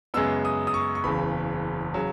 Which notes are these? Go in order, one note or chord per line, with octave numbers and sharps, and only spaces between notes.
F#2 C#3 G#3 B3 E6
D#6
D#6
C#6
C#6
F#1 E2 C#3 B5
C#3 F#3